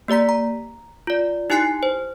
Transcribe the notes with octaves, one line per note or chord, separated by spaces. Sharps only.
A#3 G4 D5 A#5 B6
A#5
F4 D5
D#4 E4 G4 G#5 F#6 C7
C5